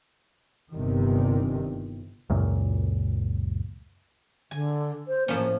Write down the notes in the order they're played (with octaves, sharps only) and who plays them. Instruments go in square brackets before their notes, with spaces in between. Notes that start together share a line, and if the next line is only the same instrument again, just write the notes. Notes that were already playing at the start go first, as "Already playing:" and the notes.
[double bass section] G1 C3 D#3
[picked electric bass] C#2 F#2 A#2
[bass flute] D3 [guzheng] G#5
[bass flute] C5
[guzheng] A2 F3 C#4 [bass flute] A#3